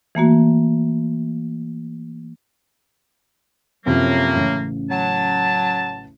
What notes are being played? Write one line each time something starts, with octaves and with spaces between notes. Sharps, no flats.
E3 A3 A#3 F#4
F#2 A2 C3 F3 F#3 A#3
A1 C#3
F#3 A5